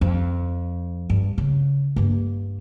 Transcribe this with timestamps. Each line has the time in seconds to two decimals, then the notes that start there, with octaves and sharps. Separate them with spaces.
0.01 F2
1.10 G2
1.38 C#3
1.96 G2 A#3